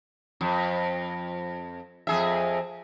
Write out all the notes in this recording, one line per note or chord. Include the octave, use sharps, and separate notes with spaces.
F2
F2 G#4 E5